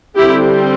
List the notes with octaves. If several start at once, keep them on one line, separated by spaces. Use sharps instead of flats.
D3 G3 C4 E4 G4